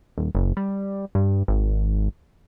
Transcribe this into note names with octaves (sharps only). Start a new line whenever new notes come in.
D#1
F#1
G3
G2
G#1